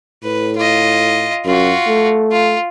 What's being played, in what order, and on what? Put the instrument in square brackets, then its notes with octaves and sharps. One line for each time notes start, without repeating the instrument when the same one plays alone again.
[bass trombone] A2 [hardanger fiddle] B4
[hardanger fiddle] F4 D#5
[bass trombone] F#2 [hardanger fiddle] F4 F#4
[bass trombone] A3
[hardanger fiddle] F4